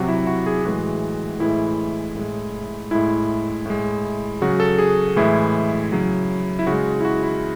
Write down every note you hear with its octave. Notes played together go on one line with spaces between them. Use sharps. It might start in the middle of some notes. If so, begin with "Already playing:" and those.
Already playing: C3 F#3 F#4
E4
F#4
G#4
A2 E3 G#3 F#4
A2 E3 G#3 E4
A2 G#3
A2 G#3 E4
A2 G#3
C#3 F#3 F#4
A4
G#4
A2 E3 G#3 E4
C#3 F#3
E4
C#3 F#4
G#3
E4
F#4
E4